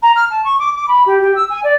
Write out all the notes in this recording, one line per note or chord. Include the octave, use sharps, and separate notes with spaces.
A#5
F6
A5
C#6
D6
D6
B5
G4
G4
E6
G#5
D5